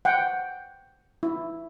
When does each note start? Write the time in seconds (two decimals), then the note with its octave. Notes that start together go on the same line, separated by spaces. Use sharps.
0.05 F#5 G5
1.23 E4